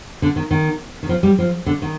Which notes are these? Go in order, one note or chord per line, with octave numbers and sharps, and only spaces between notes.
D3
D#3
D#3
D#3
F3
G3
F3
D3
D#3